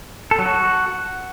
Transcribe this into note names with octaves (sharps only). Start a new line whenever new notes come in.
A4
F#3
F#4